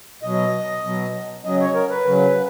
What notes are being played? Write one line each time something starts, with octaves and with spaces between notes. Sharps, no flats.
B2 F#3 D#5
B2 F#3
C#3 F#3 D#5
C#5
A#4
B4
C#3 F#3